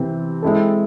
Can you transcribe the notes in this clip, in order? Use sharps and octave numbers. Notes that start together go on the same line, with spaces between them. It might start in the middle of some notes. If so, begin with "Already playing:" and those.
Already playing: C3 E3 C4
G#3 C4 E4 A4